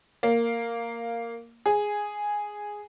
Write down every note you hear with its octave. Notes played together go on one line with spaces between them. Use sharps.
A#3
G#4